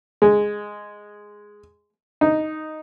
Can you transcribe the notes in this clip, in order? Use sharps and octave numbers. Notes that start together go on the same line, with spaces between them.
G#3
D#4